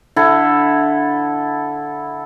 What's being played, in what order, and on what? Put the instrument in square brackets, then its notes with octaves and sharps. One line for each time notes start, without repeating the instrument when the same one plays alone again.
[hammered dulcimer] D3 E4 A4